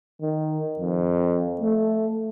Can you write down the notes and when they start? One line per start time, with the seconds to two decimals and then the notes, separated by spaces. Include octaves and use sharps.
0.22 D#3
0.79 F2
1.61 A3